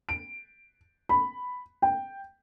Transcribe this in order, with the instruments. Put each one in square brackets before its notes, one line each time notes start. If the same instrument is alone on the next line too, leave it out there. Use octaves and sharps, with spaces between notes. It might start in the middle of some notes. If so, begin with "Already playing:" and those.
[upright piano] D7
B5
G5